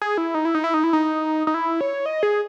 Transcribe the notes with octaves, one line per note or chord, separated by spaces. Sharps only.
G#4
E4
D#4
E4
D#4
E4
D#4
E4
D#4
D#4
E4
C#5
D#5
G#4